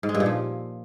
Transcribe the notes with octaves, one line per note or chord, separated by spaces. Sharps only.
G#2
G#3
G2
A#2
F3